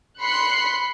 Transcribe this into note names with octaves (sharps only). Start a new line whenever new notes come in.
B5 C6 F#6 C7 C#7